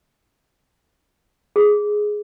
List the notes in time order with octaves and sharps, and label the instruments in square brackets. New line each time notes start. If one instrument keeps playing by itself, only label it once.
[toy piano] G#4